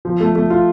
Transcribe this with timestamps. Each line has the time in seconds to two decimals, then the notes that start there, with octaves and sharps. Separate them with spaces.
0.05 F3
0.20 A3
0.36 A3
0.50 F4